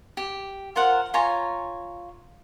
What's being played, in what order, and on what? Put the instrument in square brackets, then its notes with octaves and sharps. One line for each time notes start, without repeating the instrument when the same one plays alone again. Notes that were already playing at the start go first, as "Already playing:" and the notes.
[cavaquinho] G4
F4 A#4 C5 F#5
F4 C#5 G#5 A#5